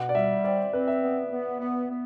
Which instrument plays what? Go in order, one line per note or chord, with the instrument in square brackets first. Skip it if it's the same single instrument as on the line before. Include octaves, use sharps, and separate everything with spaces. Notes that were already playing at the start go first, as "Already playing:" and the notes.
Already playing: [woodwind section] B2 [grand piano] F#5
[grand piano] D5
[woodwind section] G3 [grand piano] E5
[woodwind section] C4 [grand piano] D5
[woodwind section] C4 [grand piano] B4
[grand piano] E5
[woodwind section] B3
B3
B3
B3